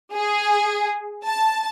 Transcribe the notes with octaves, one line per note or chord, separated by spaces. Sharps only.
G#4
A5